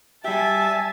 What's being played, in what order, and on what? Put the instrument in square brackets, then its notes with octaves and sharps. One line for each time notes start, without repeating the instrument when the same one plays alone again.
[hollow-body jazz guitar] G3 G4 [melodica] E5 [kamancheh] G#5 A5